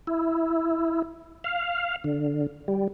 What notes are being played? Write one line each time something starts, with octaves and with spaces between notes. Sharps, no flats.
E4
F5
D3
G3